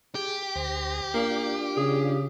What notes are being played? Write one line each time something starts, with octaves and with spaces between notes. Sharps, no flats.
G4 G#4
D2 C5 A#6
A#3 D4 F4
C#3 G#4